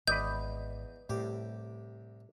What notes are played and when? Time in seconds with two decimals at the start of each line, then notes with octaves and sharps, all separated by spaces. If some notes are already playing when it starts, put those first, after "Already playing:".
0.08 G#1 E2 B4 D5 D#5 G6
1.09 C2 A2 G4 D6